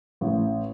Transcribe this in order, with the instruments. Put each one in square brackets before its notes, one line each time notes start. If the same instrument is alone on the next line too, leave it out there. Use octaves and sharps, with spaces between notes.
[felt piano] A1